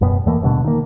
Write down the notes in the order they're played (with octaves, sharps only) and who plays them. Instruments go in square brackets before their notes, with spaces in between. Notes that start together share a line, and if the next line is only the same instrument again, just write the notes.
[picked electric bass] E1 F#2 B2 B3
E2 E3 A3 A#3
D#1 G2 B2 D3
D#3 A#3